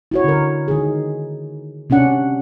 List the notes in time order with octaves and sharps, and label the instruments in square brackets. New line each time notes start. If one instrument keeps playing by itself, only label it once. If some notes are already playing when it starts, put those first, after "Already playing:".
[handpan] E4 F#4 C#5
D3 A#4
D#3 G#4
C3 C#4 D4 F#5